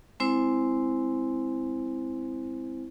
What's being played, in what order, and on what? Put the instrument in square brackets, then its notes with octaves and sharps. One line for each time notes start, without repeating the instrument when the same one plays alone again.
[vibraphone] G#3 C4 E4 C5